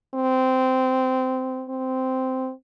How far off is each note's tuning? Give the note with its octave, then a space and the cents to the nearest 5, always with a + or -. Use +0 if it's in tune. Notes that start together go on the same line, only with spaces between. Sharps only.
C4 -15
C4 -10